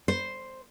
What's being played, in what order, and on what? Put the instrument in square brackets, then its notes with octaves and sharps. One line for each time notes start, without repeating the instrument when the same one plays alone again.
[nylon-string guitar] C5